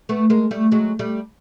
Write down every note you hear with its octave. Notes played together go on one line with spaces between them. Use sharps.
A3 B3
G#3 A#3
G3 A3
F#3 G#3
G3 A3